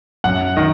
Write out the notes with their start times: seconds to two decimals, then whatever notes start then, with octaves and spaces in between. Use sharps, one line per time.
0.24 F#2 F#5
0.57 D#3 D#5